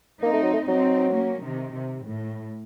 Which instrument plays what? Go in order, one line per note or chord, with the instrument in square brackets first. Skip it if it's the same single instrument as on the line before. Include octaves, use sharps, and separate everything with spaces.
[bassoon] A#3 [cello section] C4 D#4
[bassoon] A3
F#3
A3
[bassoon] F#3 [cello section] C4 D#4
[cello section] A#3 C#4
C3 D#3
C3
A2